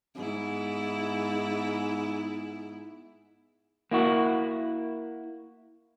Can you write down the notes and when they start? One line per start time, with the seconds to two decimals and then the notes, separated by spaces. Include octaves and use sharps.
0.15 G#2 B3 E4
3.91 A#3 E4 F#4